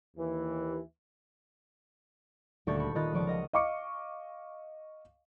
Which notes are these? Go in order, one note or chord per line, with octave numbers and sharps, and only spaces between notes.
D#2 E3
D#1 D2 A4 C#6 G6 A6
B5 C#6
D#3 F4 D#5 B5 F#6 A6
C#2 F3 D5 C#6 D6
A#4 D#5 F#5
D#5 F5 C#6 D6 C#7